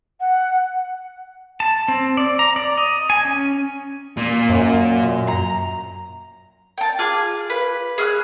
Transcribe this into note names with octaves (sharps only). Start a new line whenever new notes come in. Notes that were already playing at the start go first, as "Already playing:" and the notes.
F#5
A5
C4
D5
A#5
D5
D#5
G#5
C#4
A#2
F#2
A#5
G5 A5
F4 G#4 D6
B4
G#4 F6 F#6